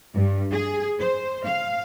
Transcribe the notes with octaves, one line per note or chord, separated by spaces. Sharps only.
G2
G#4
C5
F5